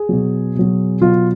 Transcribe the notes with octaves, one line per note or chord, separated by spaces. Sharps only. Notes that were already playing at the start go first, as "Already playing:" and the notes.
Already playing: G#4
B2 F#3
B2 F#3
B2 F#3 F4